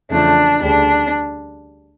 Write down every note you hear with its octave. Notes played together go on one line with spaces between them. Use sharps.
E2 C#3 F3 A3 D4
D2 C#3 G3 D4